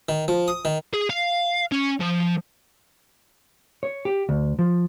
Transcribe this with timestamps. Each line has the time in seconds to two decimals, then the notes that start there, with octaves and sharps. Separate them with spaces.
0.09 D#3
0.28 F3
0.48 D#6
0.65 D#3
0.94 G#4
1.10 F5
1.72 C#4
2.00 F3
3.83 C#5
4.05 G4
4.29 D2
4.59 F3